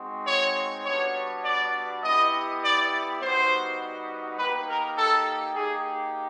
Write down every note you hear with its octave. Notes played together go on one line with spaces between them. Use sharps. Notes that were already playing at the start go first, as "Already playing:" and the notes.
Already playing: G#3 C4 D#4 F#4
C#5
G3 B3 D4 F#4 C#5
D5
B3 E4 G4 D#5
D5
G3 B3 D#4 F#4 C5
A#3 D#4 G4 B4
A#4
A4
A#3 D#4 G4 G#4